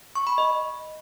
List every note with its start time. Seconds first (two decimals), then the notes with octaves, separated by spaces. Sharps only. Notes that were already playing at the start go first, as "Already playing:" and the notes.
0.15 C#6
0.27 B5
0.38 D#5